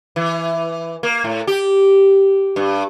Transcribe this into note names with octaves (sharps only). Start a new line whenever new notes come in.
E3
A#3
A2
G4
G2